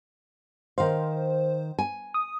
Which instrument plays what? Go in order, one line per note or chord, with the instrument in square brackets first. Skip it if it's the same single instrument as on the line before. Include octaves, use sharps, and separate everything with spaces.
[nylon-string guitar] D#3 F5 [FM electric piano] C5
[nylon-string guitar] G#5
[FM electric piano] D#6